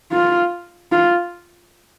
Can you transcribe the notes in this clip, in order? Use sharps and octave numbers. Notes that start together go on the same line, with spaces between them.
F4
F4